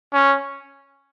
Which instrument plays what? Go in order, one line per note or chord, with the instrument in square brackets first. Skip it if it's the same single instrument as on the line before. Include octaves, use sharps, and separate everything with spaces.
[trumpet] C#4